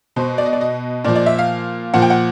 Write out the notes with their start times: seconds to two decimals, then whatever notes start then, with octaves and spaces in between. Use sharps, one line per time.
0.16 B2 C5
0.38 D5
0.46 D#5
0.53 D5
0.61 D#5
1.04 A#2 D5
1.08 F3
1.16 D5
1.26 E5
1.39 F5
1.94 A#2 F3 F#5
2.02 G5
2.10 F#5